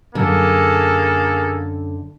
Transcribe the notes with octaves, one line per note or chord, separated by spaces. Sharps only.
F#2 D3 A#3 G#4 A4